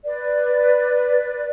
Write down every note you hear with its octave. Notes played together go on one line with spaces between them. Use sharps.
B4 D5